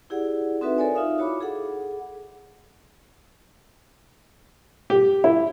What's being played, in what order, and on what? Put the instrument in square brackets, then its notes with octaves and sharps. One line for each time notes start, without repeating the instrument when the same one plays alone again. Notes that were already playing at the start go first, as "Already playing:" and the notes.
[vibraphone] E4 G4 G#4 D5 F#5
C4 D#4 F#4 A4 B4 E5
A4 A#4 C#5 D5 G#5
D#4 F4 E5 F5 D#6
E4 F#4 C#5 B5 D6
G#4 A4 F#5
[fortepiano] G4
E4